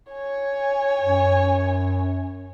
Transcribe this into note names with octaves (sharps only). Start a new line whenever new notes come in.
C#5 G#5
F#2